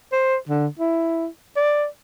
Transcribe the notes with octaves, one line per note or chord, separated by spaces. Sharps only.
C5
D3
E4
D5